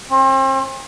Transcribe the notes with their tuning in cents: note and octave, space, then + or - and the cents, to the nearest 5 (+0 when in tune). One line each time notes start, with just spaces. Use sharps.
C4 +40